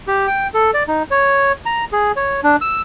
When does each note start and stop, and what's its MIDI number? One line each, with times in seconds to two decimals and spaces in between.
0.07 0.27 67
0.27 0.48 79
0.54 0.71 69
0.74 0.83 74
0.88 1.03 63
1.11 1.52 73
1.66 1.85 82
1.92 2.12 68
2.16 2.41 73
2.43 2.56 62
2.61 2.82 88